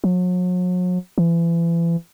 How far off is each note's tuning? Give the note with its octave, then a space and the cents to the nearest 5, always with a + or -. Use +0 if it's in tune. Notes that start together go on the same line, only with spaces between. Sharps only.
F#3 -40
E3 +35